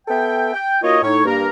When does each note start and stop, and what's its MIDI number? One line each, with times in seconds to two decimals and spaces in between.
0.08 0.53 59
0.08 0.53 69
0.08 0.53 76
0.08 0.53 79
0.53 0.76 79
0.81 0.97 58
0.81 0.97 63
0.81 0.97 65
0.81 0.97 66
0.81 0.97 73
0.81 0.97 75
1.02 1.22 45
1.02 1.22 63
1.02 1.22 73
1.25 1.49 43
1.25 1.49 58
1.25 1.49 70